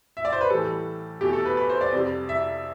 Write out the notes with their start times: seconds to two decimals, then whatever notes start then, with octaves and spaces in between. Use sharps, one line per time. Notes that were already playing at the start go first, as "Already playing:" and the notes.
0.17 E5
0.25 D5
0.33 C5
0.41 B4
0.50 A2 E3 G3 A4
1.21 E2 B2 A3 G4
1.33 A4
1.45 B4
1.57 B4
1.70 C5
1.81 D5
1.92 F2 C3 G3
2.29 E5